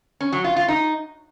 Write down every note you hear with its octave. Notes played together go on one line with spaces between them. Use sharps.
C#4
F#3
F4
F4
D#4